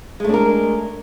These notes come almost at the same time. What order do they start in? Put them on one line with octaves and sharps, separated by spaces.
G#3 A3 D4 A#4